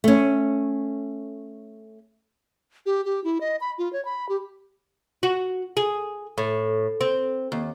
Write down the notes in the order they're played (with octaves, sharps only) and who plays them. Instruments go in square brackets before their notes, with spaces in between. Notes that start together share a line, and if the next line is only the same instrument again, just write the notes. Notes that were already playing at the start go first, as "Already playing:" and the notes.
[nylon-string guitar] A3 C#4
[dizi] G4
G4
E4
D#5
B5
F4
C#5
B5
G4
[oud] F#4
G#4
A2
C4
D#2